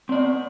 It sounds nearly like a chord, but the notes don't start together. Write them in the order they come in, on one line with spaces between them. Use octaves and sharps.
C4 D5 B3